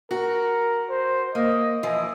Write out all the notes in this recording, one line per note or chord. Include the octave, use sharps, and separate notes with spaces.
F#4 A#4
C5
A#3 D#5
E3 F3 D#5